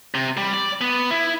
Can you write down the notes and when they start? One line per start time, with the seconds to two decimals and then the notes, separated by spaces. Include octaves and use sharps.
0.14 C3
0.37 G3
0.54 D5
0.81 B3
1.11 E4